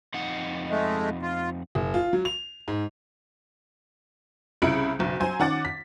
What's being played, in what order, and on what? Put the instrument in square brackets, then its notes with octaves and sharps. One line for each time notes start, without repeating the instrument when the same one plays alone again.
[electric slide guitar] F2 D#4 F#5
[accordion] G#3 A3
F4
[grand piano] F#1
F4
F#3
F7
G#2
[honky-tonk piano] C2 C#3 E4 B5 C#7 D7
F#1 B1
F#3 C5 G#5
D#3 C#4 F#5 D6 A6
B6